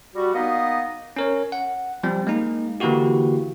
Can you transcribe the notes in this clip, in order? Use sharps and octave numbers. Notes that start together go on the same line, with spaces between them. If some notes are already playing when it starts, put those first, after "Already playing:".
G3 F#4
A#3 B3 D#4 D#5 F5
C#4 A#4 C#5
F#5
F3 G3 C4
G#3 A#3 D#4
D3 E3 A#3 E4 F#4 G4